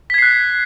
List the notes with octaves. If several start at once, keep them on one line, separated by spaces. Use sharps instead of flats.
F#6 G#6 B6 C7